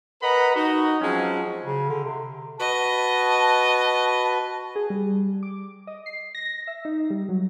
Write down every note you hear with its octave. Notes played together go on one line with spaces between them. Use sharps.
A#4 B4 D#5 F#5 A#5 B5
D#4 F#4
F3 F#3 G#3 C4 C#4
C#3
D3
C3
F#4 B4 D#5 A5
G#4
G3
D6
D#5
C7
A#6
E5
D#4
G3
F#3